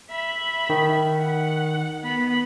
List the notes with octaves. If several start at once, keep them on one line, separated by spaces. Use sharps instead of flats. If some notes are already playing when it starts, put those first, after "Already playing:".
E5 B5
D#3
F#5
B3 B5